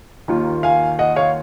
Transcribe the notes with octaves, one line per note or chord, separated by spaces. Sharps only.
D#2 D#3 A#3 F4
F5 G#5
D#5 F#5
C#5 F5